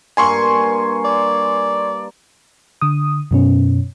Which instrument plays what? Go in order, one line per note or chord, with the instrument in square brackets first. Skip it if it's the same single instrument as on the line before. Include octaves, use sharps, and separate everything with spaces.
[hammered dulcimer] G2 A#3 [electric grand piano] G#5 C6 C#6
[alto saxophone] D5
[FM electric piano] D3 D#6
F#2 B2 C#4